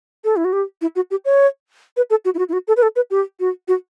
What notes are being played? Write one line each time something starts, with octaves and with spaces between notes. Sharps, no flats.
A4
E4
F#4
G4
E4
F#4
G4
C#5
B4
A4
F#4
E4
F#4
E4
F#4
A4
B4
A4
B4
G4
F#4
F#4